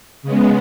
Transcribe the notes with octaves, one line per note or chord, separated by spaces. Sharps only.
C#3 G#3 B3